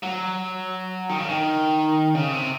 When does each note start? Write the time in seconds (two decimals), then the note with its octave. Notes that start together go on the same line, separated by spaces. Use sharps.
0.03 F#3
1.09 D#3
1.19 C#3
1.29 D#3
2.15 C#3
2.33 C3